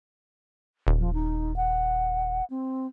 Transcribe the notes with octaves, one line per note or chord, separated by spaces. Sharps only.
D#1
F3
D#4
F#5
C4